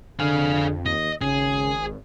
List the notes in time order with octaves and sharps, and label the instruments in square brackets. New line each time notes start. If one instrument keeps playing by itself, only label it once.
[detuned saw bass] F2 [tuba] D3 [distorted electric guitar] G#4 F5
[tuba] D#2 [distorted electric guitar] D#5
[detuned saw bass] G#1 [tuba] C#3 [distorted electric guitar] G#4